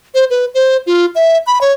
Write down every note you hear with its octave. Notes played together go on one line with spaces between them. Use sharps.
C5
B4
C5
F4
E5
B5
C#5